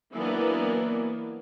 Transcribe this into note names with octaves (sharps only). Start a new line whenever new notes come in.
E3 F#3 A#3 B3 D4